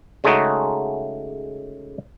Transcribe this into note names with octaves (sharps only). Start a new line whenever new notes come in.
C#3 G#3 A3 C#4 D#4 F#4